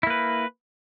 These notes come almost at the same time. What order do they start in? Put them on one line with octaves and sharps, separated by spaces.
E4 A#3 B4